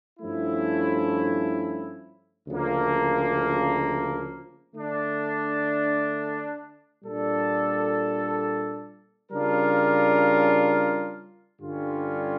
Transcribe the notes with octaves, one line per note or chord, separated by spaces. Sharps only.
G2 F3 A3 C#4 E4
D2 C#3 F3 A#3
D3 A3 D4
A#2 G3 D4 A4
C#3 G3 D4 F4 A#4
G2 D3 G3 C#4 F4